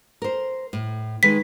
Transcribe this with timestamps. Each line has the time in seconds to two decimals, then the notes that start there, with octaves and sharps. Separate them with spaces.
0.22 A#4 C5
0.73 A2
1.23 D#3 G#3 B4 B6